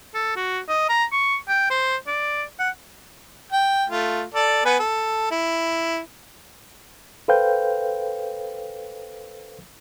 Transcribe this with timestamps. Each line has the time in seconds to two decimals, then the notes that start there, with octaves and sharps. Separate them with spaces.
0.14 A4
0.36 F#4
0.69 D#5
0.89 A#5
1.12 C#6
1.48 G5
1.70 C5
2.07 D5
2.59 F#5
3.52 G5
3.90 A3 F4
4.34 A4 D5
4.65 B3 B4 G#5
4.79 A4
5.31 E4
7.28 A4 B4 C5 F5 G5 G6